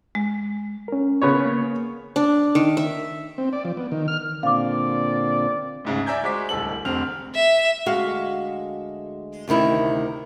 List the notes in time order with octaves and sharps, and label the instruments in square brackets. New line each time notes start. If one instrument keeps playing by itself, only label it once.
[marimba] G#3
[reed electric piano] C#4 A#4
[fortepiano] C#3 B3 C#5
[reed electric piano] A#3
[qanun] D4
D#3
E5
[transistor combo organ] C4
D5
F3
B3
D#3
F6
[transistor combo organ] A#2 D3 C4 [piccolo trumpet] D5 [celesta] F5 D6
[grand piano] D2 G#2 C#3
D5 E5 G#5 A#5 G6 G#6
G#3 F#4 C5 D6 B6
D1 C2 A4 F#7
F1 D3 C4 F6 F7
[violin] E5
[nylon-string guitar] D2 G#3 F#4 F5
D2 C3 D#3 E4